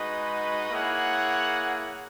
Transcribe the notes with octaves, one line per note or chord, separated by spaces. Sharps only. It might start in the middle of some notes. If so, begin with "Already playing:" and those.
Already playing: G#3 D#4 F#4 B4 D#5
A#3 E4 G#4 C#5 F#5